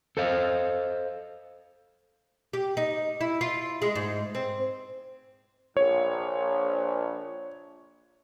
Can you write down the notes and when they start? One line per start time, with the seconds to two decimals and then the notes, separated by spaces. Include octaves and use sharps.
0.17 A4 C5 D#5 F5
2.53 G4
2.77 D#4
3.21 E4
3.41 F4
3.82 G#3
3.95 G#2
4.35 C4
5.77 A#1 C#5